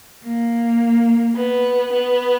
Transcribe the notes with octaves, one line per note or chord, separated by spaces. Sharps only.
A#3
B3
B3